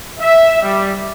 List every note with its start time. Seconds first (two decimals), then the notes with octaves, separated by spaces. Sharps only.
0.20 E5
0.62 G3